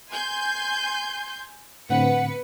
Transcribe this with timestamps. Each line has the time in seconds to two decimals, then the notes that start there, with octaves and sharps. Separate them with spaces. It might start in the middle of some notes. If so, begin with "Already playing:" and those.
0.11 G#5 C6 G6
1.90 A2 D3 B3 C4 B4 F#5 C#7